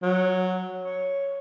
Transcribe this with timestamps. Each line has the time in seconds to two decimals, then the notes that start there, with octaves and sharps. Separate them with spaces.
0.03 F#3
0.85 C#5